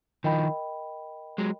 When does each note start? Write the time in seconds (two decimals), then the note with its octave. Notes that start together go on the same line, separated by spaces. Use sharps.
0.24 D#3 F3 A#4 D#5 G5 B5
1.38 F#3 G#3